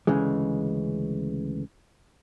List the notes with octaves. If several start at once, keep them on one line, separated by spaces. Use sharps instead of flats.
D2 C#3 E3 G#3